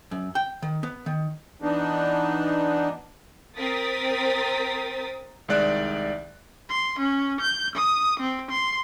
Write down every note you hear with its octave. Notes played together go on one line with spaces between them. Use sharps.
F#2
G5
D#3
B3
D#3
E3 B3 D4 D#4
C4 A#4 D#6 A6 B6
C2 D#3 G#3 D5 F#6
C6
C#4
G6
D#6
C4
C6